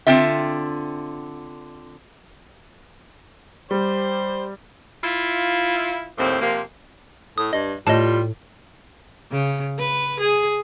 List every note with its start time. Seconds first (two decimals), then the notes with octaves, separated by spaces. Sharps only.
0.07 D3 C4 F4 E5
3.71 G3 G4 C5
5.02 E4 F4
6.18 D#2 A2 C4
6.41 C3 F3 A#3
7.38 A2 D#6
7.53 G2 D#5
7.87 A2 G3 F4 D#5 A5
9.31 C#3
9.78 B4
10.20 G#4